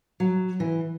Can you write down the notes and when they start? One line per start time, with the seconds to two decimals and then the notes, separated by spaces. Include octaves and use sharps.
0.20 F#3
0.60 E3